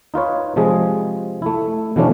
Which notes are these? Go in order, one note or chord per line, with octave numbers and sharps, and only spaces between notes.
D#4 F4 B4 C#5
C3 F3 G#3 G#4
A3 E4
B2 E3 F3 A3 C#4 D4